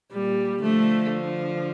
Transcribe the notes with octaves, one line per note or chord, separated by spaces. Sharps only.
A#2 G3
D3 F3 A3